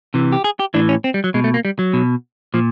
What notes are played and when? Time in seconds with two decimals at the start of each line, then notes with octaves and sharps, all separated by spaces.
0.14 C3 E3
0.32 G4
0.44 G#4
0.59 G4
0.74 A2 E3 D4
0.89 C#4
1.04 C4
1.14 G3
1.24 F#3
1.34 B2 G#3
1.44 A3
1.54 A#3
1.65 G3
1.79 F#3
1.93 B2
2.54 A#2 F3